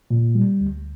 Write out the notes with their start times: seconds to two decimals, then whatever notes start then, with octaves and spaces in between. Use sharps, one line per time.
0.11 A#2
0.35 G3
0.61 D2